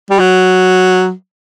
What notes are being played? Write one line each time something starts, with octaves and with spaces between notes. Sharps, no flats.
G3
F#3